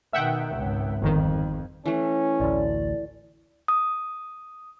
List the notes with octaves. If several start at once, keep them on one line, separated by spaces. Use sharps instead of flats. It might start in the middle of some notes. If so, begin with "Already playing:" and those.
B2 D#3 E5 F#5 G5
G#1 C#2
G1 F2 D#3
E3 A3 C#4
A1 D2 D5
D#6